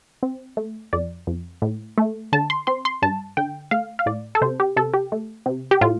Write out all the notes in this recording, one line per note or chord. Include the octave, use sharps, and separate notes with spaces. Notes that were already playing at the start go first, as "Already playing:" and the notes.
C4
A3
F2 D5
F2
A2
A3
D3 A5
C6
C4 C6
C6
G2 A5
D3 G5
A3 F5
F5
A2 D5
A4
C3 C5
G4
C3 A4
G4
A3
C3
G4
A2 F4